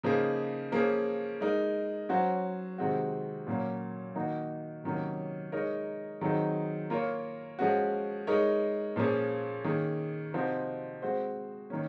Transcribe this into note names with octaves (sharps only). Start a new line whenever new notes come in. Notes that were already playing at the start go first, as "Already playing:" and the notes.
C#3 F3 A#3 D#4 G#4
F3 A#3 C#4 G#4
G#3 D#4 A#4
F#3 C#4 F#4 C5
C3 D#3 G#3 C4 F#4
A#2 F#3 A#3 C#4
D#3 A#3 D#4 F#4
C3 D#3 F#3 A#3 C#4
G#3 D#4 A#4 C#5
D#3 F#3 C4 D#4 G#4
A#3 F4 A#4 C#5
F3 G#3 C#4 F#4
G#3 D#4 A#4 C#5
A#2 F3 A#3 C#4 G#4
D#3 A#3 C#4 G#4
C3 F3 C4 D#4 F#4
G#3 C4 F#4 C5
D#3 A#3 C#4